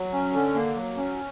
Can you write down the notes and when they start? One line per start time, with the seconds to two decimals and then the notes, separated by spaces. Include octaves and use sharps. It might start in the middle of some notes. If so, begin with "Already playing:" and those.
Already playing: F#3
0.13 C#4
0.33 D3
0.55 A#3
0.76 F#3
0.97 C#4